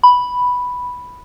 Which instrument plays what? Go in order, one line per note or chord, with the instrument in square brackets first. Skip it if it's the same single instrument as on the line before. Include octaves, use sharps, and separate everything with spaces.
[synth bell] B5